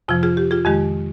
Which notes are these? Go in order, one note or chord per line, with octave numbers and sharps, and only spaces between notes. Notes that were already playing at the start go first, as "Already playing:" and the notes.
F2 C3 F3 F4
F4 G#4
G4
F4 G#4
F2 D#3 G#3 G4